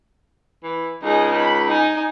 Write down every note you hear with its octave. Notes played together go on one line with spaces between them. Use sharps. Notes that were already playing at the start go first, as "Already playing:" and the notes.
E3
C#2 D#4 G#4
B5
D#4 G#5